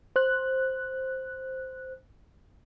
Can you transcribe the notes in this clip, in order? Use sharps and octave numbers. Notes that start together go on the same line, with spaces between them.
C5 F#6